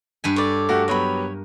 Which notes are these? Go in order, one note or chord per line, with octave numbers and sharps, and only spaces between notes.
G2 B4 G#5
A4 C#5 D5
A3 F#4 G4 A#4
F#3 B3 G4 C#5 B5